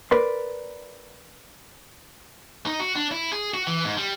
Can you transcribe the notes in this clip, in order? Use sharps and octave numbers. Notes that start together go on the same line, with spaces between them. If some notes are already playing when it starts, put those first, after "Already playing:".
A#4 B4 D5 C6
D#4
F#4
D4
E4
G#4
F#4
E3
G#2
G3